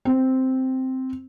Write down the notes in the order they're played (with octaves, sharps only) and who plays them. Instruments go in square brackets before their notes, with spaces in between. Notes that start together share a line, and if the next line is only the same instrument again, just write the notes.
[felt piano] C4